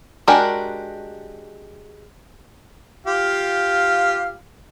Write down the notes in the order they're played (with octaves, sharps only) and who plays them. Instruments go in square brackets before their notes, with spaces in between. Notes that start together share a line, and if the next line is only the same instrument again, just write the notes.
[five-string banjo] G#3 D4 F#4 G4 A#4
[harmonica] F4 G4 F5